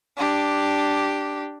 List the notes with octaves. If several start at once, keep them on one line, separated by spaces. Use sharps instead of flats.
D4 G4